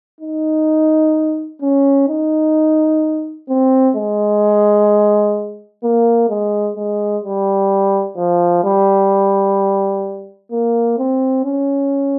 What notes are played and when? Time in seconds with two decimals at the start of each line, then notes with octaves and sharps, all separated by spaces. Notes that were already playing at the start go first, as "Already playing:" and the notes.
0.21 D#4
1.62 C#4
2.09 D#4
3.49 C4
3.96 G#3
5.83 A#3
6.29 G#3
6.77 G#3
7.23 G3
8.17 F3
8.64 G3
10.52 A#3
10.98 C4
11.44 C#4